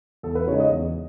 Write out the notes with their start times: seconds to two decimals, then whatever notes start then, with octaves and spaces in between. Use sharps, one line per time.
0.23 E2 A4
0.35 B4
0.47 C#3 G#3 D#4 C#5
0.60 D#5
0.71 E2